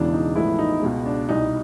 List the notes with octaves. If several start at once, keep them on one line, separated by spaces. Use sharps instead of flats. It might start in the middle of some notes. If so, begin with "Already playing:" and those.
Already playing: E1 E2 C#3 E3 D4
D#4
A1 A2 F3 G#3 B3 E4
D#4
C#2 B2 G#3
D4
C2 B2 G3 D#4